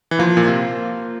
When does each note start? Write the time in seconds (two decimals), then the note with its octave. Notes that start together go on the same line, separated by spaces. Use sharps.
0.11 E3
0.19 F3 A#3 F4 C5
0.37 A#2
0.47 C3